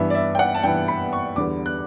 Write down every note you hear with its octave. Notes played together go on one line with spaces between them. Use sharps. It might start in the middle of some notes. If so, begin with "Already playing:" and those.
Already playing: G2 E3 B3 E5
D5
E5
G5
F#5
A5
G2 E3 B3 G5
B5
C#6
E2 D3 G3 B3 D6
F#6